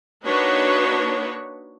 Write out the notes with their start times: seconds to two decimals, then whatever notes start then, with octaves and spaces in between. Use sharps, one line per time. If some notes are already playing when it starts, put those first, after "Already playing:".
0.25 A#3 D4 D#4 F#4 B4 C#5